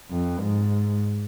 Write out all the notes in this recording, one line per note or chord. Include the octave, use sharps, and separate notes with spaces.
F2
G#2